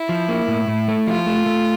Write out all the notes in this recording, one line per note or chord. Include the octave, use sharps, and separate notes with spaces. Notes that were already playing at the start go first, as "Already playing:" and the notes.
Already playing: E4
F3
A#3
A2
A2
A3
F3 F4
A3
A3